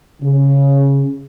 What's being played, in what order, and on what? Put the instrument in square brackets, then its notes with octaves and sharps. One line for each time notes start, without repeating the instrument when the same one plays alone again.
[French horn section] C#3